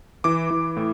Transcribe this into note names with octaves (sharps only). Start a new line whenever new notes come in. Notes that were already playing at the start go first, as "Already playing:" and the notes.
E3 D6
E3
A2